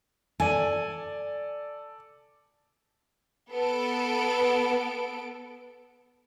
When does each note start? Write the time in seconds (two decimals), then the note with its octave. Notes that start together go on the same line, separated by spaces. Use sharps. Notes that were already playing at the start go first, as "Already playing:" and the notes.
0.40 A4 D5 G#5
3.51 B3 A4 D7